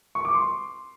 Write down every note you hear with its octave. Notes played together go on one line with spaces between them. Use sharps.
C#6
D6
C6